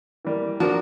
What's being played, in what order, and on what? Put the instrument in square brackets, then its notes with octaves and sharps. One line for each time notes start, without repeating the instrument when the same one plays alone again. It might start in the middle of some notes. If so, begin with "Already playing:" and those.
[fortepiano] E3 G3 A#3
[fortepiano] F3 D4 A#4 [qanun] F#4